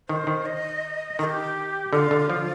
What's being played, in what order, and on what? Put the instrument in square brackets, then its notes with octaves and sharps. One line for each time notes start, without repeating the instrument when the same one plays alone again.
[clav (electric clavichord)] D#3 [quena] C5
[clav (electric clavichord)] D#3
[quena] D#5
[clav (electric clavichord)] D#3 [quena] A#4
[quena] G4
[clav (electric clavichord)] D3 [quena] F4
[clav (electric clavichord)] D3
F3